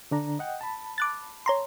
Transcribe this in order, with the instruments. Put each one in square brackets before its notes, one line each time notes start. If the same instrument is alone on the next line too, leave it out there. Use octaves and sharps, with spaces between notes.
[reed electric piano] D3 D4 A#5
D#5 F#5 G5
A5 B5
[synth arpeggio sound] D6 F#6 A6
C#5 A#5 C6